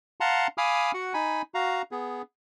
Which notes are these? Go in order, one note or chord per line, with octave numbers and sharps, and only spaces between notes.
F5 F#5 A5 A#5 C6
F5 G#5 B5 D6 D#6 F6
F#4 F#5
D#4 G#5 B5
F#4 F5 A#5
B3 G#4